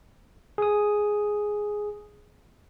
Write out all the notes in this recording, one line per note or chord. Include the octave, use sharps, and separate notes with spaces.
G#4 D#6